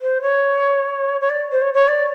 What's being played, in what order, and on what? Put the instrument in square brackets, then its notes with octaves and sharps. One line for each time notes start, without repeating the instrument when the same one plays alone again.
[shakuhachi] C5
C#5
C#5
D5
C5
C#5
C#5
D5